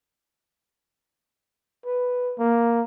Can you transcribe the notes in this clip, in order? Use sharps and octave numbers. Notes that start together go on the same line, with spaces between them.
B4
A#3